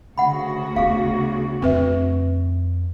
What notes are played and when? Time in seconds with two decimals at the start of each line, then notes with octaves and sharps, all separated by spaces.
0.18 D2 C#3 F#4 F#5 B5
0.76 B3 F4 G#4 F5
1.62 F2 D3 C4 B4 E5